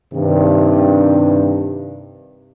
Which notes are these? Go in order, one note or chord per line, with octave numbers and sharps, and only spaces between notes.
G2 C3 D#3